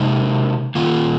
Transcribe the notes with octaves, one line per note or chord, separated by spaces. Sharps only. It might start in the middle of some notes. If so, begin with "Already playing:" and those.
Already playing: C3 G#3 D#4
D#3 A#3 F4